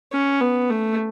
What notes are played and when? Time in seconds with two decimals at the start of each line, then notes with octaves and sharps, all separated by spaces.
0.12 C#4
0.41 B3
0.70 A3